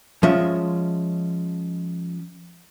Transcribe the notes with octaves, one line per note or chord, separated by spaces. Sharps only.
F3 G#3 C#4 F4 E5